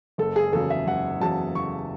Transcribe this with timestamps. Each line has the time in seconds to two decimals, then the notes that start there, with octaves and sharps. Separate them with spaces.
0.18 F#1 A4
0.36 G#4
0.53 E2 C#3 F#3 A4
0.70 E5
0.87 F#1 F#5
1.20 E2 C#3 F#3 A5
1.55 F#1 C#6